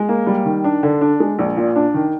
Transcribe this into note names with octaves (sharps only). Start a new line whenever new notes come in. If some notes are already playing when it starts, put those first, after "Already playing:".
Already playing: G#3
A#3
G3
D#3
D4
D3
D4
G#3
A#1
A#2
D4
D#3